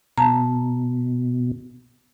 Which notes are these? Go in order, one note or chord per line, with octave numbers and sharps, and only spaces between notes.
B2 A5 A#5